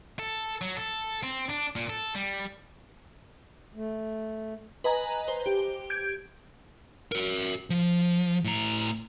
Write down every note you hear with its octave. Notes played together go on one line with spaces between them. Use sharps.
A4
F#3
A4
C4
D4
A#2
A4
G3
A3
B4 D#5 G#5 A#5
C5
G4
G6 G#6 D7
F#4 A#4
F3
A2 A#5